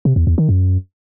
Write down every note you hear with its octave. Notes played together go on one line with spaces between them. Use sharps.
C3
E2
E2
D#3
F#2